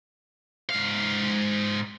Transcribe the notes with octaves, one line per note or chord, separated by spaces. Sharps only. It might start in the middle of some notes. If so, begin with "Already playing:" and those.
G#2 F5